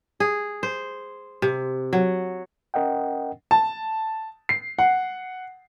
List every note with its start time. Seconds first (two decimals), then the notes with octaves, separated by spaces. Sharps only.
0.20 G#4
0.63 C5
1.42 C3
1.93 F#3
2.74 C#4 A#4 D#5 F#5 G5
3.51 A5
4.49 C7
4.79 F#5